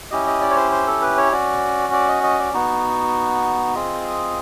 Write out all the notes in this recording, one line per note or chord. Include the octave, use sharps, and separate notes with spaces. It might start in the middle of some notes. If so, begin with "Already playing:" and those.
C#4 E4 G4 D#5
D#5
D5
C#5
C5
C5
A4
B4
C#5
C#4 F#4 D5
D5
D#5
D#5
D5
B3 D#4 F#4
C4 F4 G#4 D#5